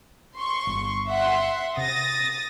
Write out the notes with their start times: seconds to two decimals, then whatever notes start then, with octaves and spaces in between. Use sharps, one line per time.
0.36 C6 C#6
0.67 G1
1.07 E5 F#5 C6
1.77 C3 D#6 A6 A#6